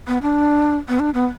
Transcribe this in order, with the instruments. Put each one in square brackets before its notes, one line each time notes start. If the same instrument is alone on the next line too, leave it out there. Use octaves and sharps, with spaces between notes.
[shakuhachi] B3
D4
B3
D4
B3